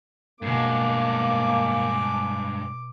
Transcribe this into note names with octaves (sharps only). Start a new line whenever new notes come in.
G2 B2 G#3 A#3 D6 C7